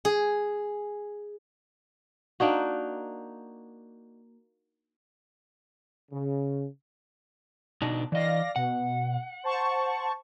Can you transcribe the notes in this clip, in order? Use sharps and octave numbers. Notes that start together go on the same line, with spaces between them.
G#4
A#3 D4 D#4 F#4
C#3
B2 D4 D#4
E3 D5 D#5 F5 A#6
B2 F#5
C5 A5 C#6